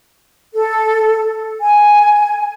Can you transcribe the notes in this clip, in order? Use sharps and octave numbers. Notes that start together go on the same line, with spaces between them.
A4
G#5